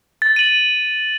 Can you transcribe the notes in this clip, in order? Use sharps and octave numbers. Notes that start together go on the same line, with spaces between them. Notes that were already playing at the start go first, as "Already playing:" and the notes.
A6
D#7 F#7